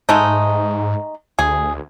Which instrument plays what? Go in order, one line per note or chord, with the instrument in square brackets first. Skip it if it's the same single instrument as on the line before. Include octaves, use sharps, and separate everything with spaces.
[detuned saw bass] G#2 [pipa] G#3 A3 D#4
[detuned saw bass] D2 [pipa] G#4